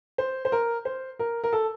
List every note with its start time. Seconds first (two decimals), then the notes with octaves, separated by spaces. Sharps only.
0.18 C5
0.45 C5
0.52 A#4
0.85 C5
1.19 A#4
1.44 A#4
1.53 A4